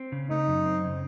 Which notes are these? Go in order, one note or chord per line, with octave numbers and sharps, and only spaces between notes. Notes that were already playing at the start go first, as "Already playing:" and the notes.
Already playing: C4
C#3
A3 D#4
F#2
C4
C#3